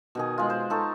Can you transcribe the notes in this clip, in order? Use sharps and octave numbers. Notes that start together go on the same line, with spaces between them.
B2 D#3 G#4
G#3 F4
C5
D#4 A4 C#6